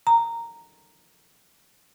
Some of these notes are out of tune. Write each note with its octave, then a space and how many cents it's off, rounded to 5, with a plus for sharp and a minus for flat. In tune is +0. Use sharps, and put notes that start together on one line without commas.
A#5 -10